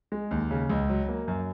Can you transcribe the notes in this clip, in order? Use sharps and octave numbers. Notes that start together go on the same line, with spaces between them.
G#3
D#2
C#3
C#2
F#3
A#3
F#2